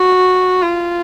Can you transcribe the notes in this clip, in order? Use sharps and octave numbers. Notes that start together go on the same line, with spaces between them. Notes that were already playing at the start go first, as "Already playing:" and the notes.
Already playing: F#4
F4